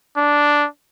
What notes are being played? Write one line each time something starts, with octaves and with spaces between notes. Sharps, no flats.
D4